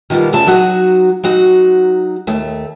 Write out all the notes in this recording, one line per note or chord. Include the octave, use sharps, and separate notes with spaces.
D#3 F3 G3 A#3 B3
D2 C#3 E5 A5
F#3 D#4 F#4 F#5
F#3 D#4 F#4
D#2 A3